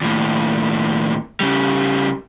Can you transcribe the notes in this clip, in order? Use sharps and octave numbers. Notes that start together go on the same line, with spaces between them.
D#2 A2
C#3 G3